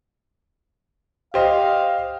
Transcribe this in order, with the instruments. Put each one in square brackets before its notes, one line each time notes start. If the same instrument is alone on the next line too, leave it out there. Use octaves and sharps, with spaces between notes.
[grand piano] G4 C5 D#5 [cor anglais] F5